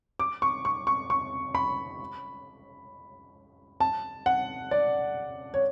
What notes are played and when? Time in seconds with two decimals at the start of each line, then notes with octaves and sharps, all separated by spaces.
0.19 D6
0.42 C#6
0.65 C#6
0.87 C#6
1.10 C#6
1.55 B5
3.80 A5
4.26 F#5
4.71 D5
5.54 C#5